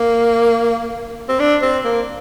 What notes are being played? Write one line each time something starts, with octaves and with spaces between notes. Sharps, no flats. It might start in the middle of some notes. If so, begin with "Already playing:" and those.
Already playing: A#3
C4
D4
C4
A#3